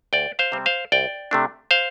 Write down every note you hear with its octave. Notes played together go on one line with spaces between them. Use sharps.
D2 D5 G5
C5 F5
C3 G3 C4
C5 F5
C2 D5 G5
C3 A3 D4
C5 F5